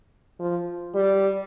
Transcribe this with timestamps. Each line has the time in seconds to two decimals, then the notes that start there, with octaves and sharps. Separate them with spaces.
0.39 F3
0.95 G3